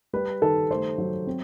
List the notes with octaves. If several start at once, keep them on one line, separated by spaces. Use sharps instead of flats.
G3 B4
D#3 A4
A3 C5
F#3
C4